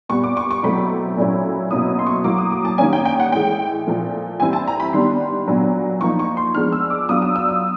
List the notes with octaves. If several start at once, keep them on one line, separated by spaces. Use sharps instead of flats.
A#2 G3 B3 C#6
D6
C#6
C#6
B2 F#3 A3 C4 E4 B5
A#2 F#3 A3 C#4 E4
B2 F#3 A#3 C#4 E4 D#6
C6
C#6
A2 F#3 A#3 D6
D#6
D6
A5
D#3 G3 A#3 C#4 G#5
G5
G5
F#5
A2 E3 G#3 G5
A#2 F3 A3
E3 G3 C4 E4 G#5
A5
A#5
B5
D#3 G3 B3 D4 C6
A#2 F#3 B3 D4
F3 A#3 D#4 C#6
C#6
C6
F3 G#3 B3 D4 F6
E6
D6
F#3 B3 D4 F4 D#6
E6
E6
D#6